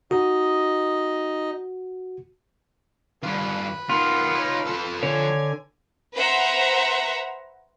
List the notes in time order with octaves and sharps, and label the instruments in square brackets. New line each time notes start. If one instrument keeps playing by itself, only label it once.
[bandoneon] D#4 D#5 [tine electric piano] F#4
[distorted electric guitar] G2 F4 [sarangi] B4
[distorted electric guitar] D#3 B3 [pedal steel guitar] F4
[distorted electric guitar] D#4 C#5
F3 A4
[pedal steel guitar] D3 C#5 [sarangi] G#5
[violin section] B4 C5 E5 F#5 A#5